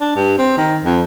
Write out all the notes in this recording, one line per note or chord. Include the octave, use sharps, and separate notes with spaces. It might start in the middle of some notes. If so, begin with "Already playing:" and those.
D4
G2
C4
D#3
F2